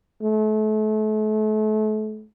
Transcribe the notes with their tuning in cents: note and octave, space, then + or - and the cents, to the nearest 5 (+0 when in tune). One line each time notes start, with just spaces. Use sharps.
A3 -35